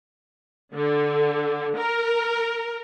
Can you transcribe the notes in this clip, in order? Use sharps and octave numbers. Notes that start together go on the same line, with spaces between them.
D3
A#4